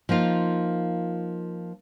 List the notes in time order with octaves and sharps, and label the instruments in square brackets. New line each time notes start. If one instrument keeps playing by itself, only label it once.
[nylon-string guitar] F3 A#3 D#4 F4